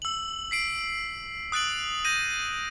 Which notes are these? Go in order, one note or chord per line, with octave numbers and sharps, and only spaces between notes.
E6 F#7
B6 C7 D7
D#6 F#6 A6 D7 F#7
G6 A#6 D#7